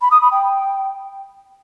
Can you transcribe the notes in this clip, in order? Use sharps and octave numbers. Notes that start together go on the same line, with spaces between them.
B5
D#6
B5
G5